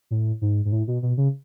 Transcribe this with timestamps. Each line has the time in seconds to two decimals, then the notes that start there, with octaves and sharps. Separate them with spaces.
0.11 A2
0.41 G#2
0.65 G#2
0.72 A2
0.88 B2
1.02 B2
1.17 C#3